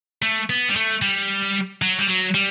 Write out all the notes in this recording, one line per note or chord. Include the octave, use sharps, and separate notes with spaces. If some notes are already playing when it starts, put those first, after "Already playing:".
A3
B3
G3
A3
G3
F#3
G3
F#3
G3